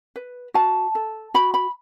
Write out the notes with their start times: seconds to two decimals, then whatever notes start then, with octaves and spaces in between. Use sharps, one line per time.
0.16 B4
0.54 F#4 A5
0.95 A4
1.34 F#4 B5
1.54 B5